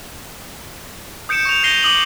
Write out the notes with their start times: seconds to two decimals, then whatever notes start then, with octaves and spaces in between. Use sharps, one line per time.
1.29 D#6 G6 C#7 D7 E7
1.45 C#6 G6 F7
1.63 G6 A#6 C7 D#7 G7
1.83 D6 D#6 F#7